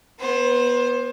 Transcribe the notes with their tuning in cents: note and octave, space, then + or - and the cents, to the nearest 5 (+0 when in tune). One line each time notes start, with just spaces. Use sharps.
B3 -20 C5 +20